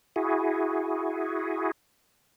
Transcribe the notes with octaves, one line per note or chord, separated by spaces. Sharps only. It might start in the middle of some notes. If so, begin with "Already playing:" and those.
E4 F#4 G#4